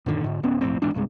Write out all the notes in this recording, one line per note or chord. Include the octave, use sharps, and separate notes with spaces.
F#2 A#2 D3 D#3
G#2 D3
D1 B3 C#4
B1 F2 A2 C4
D#1 E2 G#2 D4
B1 G2 C3 G#3